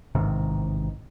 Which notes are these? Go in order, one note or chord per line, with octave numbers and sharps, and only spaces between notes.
A1 G#2 C3 D#3